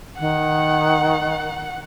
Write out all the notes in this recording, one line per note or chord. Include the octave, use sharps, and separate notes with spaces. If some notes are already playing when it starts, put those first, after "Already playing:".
D#3 F#5